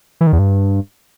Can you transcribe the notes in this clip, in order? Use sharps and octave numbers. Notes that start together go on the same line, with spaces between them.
E3
D#3
E2
G2